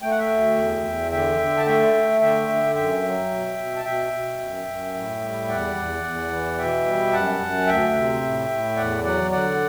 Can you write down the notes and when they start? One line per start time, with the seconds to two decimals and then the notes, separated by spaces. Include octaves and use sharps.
0.02 A3 G5
0.11 F#5
0.19 E5 G5
0.30 D2
0.57 E2
0.84 E2
1.11 D3 E5 G5
1.39 D3
1.57 A5
1.66 A3 E5 G5
1.94 A3
2.21 D3 E5 G5
2.48 D3
2.75 F#2 E5 G5
3.03 F#3
3.31 B2
3.57 B2
3.76 A5
3.85 B2 E5 G5
4.12 B2
4.39 F#2
4.67 F#2
4.94 A2
5.21 G3
5.49 E2 D5 F#5
5.76 E2
6.03 E2
6.31 E3
6.58 B2 E5 G5
6.86 G3
7.12 F#2 F#5 A5
7.40 F#2
7.67 D2 E5 G5
7.95 C3
8.22 A2
8.49 A2
8.76 E2 D5 F#5
9.03 F#3 D5 F#5
9.31 D3 D5 F#5